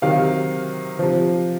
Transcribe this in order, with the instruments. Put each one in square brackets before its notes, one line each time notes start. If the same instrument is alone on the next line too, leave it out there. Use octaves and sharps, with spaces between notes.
[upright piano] C3 D#3 F#3 F5
C3 F3